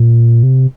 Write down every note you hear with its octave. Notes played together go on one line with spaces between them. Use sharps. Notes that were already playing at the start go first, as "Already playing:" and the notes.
Already playing: A#2
C3